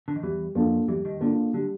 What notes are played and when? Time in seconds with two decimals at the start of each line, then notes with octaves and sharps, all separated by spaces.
0.08 D3
0.16 D#3
0.23 E2 E3 G3
0.55 F2 F3 A#3 D4 F4 A4
0.88 E2 E3 G3
1.05 D#2 D#3
1.21 D2 D3 A#3 D4 F4 A4
1.54 D3 G3